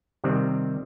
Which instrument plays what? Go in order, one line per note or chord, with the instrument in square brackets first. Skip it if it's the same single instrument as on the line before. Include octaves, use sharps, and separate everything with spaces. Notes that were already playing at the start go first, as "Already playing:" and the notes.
[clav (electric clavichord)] C3 D#3 G3 C4